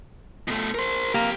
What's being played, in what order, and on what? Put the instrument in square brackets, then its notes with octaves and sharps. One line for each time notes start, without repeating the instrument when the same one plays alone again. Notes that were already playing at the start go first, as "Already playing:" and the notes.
[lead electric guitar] B2 A3
A#4 C5
[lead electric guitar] F2 G4 [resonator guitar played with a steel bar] A#3